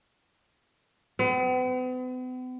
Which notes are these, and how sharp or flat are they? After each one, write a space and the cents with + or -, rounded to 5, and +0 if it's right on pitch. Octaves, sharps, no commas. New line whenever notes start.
B3 +45